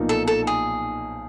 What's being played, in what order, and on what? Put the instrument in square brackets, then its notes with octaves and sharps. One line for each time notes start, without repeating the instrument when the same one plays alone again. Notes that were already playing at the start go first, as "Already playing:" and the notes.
Already playing: [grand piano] B1 A#2 F3 A#3 D#4
[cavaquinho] A4
A4
G#4